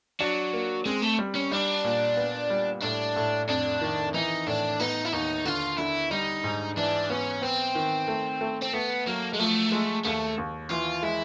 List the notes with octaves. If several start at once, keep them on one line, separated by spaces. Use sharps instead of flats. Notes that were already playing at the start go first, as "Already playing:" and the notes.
F#3 D4
A#3
G#3 C4
A3
G3
C#4
G3 D4
A#2
B3
G3
A2 D4
A2
F2 D4
D#3
E3 D#4
A2 D4
B3 D#4
E4
D#2 D#4
D3 F4
D3 E4
G3 D#4
G#2
E3 D4
B3 C#4
B3 C4
D#3
A3
A3
C4
A3 B3
F#3 A#3
G#3
F3 A3
G#3
D#2 A3
D#2
E3 F4
G#3 E4